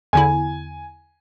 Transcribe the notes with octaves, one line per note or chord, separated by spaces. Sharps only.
E2 D3 E4 G#5